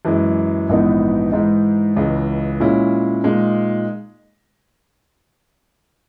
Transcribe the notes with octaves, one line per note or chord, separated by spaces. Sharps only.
F#2 E3 G#3
A#1 G#2 E3 B3 D#4
G#2 E3 G#3 D#4
C#2 C#3 E3 G#3
A#2 G#3 C#4 E4
A#2 G#3 D#4